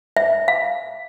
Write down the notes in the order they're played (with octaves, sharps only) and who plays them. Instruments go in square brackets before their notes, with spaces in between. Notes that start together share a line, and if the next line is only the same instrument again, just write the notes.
[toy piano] E5
F5